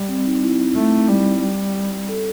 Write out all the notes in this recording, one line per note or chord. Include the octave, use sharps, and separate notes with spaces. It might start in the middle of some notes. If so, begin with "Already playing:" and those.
Already playing: G3
C4
C4
D#4
E4
A3
G3
G3
A4